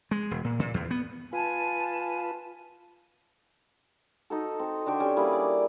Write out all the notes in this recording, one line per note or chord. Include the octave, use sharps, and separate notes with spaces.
G#3
E1
A#2
A#2
E2
B3
F4 B4 G#5 A5
D#4 F#4 A4
C4 A4
D3 D4 F#4 G5
C#4 G4
G3 A#3 E4 G#4
D5